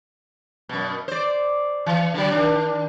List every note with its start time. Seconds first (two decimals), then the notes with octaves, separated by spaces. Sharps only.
0.69 F#2 B2
1.08 C5 D5
1.86 E3
2.14 D3 F#3
2.31 D#3 D4